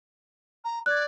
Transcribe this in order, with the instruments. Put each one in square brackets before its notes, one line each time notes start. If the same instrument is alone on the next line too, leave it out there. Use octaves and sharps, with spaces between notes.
[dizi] A#5
[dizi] D5 [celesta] F#6 G#6